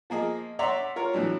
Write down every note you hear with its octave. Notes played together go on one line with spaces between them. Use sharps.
F3 A#3 G#4 D#5
C#5 D5 E5 F#5 A#5 C6
F4 A#4 C#5
A2 E3 F#3 D4